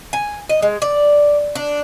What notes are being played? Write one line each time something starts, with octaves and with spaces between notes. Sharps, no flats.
G#5
D#5
G#3
D5
D4